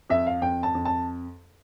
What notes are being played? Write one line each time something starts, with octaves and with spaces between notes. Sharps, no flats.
F2 E5
F5
F2 G5
A5
F2
A5